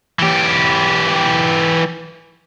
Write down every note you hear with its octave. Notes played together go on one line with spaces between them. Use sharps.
E3 G4